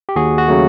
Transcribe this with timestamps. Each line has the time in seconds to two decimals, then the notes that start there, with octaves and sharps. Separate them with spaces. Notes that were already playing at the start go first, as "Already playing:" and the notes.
0.09 G4
0.16 D#2 F#4 G#4
0.38 F#4
0.48 C#3 F#3 A3